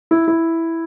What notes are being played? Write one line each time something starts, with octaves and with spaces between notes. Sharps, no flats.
E4
E4